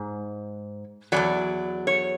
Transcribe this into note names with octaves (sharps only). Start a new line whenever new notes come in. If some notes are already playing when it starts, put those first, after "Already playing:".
Already playing: G#2
E2 C#3 F#3 D5
C#5